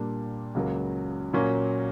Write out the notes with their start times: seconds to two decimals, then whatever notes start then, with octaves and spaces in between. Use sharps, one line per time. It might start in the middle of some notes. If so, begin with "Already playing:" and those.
Already playing: A#2 G3 A#3 D4
0.54 C#2 C#3 F#3 A#3
1.33 A#2 F#3 A#3 C#4